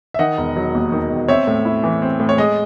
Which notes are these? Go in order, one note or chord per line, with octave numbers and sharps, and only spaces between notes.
E5
D#3 D#5 F#5
E1
F#3
D#2
D#3
E1
C4 C#5 E5
A2
E4
E3
C4
A2
C#5
G#3 D#5